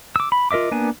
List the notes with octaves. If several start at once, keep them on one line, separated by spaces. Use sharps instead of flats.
D6 E6
B5
F4 A#4 D#5 E5 D6
A#3 B3 D4 G#5